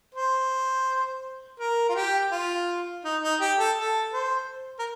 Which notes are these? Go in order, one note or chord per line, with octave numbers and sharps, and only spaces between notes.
C5
A#4
F4
G4
F4
D#4
D#4
G4
A4
A4
C5
A#4